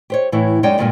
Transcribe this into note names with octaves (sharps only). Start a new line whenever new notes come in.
G4 C5 C#5
A2 E3 E4 C#5
F#2 G#3 D#4 C#5 D5 G5
G2 A#2 D3 F3 G3 G#3